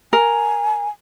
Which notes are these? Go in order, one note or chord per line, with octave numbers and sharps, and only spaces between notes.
A#4 G#5